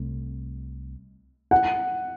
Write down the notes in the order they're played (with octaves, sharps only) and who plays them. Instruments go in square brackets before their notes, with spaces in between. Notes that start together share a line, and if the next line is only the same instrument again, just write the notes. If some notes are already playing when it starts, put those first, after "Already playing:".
Already playing: [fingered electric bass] C2 C3 A3
[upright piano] F#5